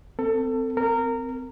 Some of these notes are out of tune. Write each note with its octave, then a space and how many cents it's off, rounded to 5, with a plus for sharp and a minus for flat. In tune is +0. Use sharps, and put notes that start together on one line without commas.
C4 -20 A4 +25
C4 -25 A#4 -20